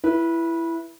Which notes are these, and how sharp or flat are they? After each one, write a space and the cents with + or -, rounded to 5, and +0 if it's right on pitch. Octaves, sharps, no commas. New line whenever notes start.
E4 +15 B4 -20